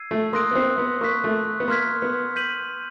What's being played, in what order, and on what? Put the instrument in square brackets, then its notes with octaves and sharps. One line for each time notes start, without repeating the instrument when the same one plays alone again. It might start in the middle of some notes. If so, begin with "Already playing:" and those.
Already playing: [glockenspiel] E6 G#6 C7 D#7
[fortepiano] A3
[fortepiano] A#3 [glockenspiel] C6 D#6 F#6 A#6 D7
[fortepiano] B3
C4
B3
[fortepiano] A#3 [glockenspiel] C#6 F#6 B6
[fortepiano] A3
B3
[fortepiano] A#3 [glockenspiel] C6 F6 G#6 B6
[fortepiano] B3
[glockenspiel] G6 B6 D#7 F#7